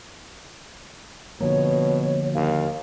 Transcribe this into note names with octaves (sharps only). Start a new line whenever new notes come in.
B2 D3 F3 A#3 C#5
D#2 F5